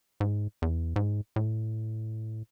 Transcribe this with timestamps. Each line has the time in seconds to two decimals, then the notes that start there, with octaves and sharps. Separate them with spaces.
0.20 G#2
0.62 E2
0.96 G#2
1.36 A2